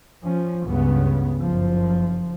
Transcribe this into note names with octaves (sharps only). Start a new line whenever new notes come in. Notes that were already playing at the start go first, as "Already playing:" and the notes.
F3 C#4
C#2 G2 C#3 B3
F#1 F3